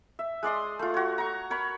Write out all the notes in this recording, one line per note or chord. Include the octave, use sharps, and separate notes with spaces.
E5
G#3 D5 C6 D#6
A3 F4
F#4 C#5
A#5 C#6
A#4 C#5 B5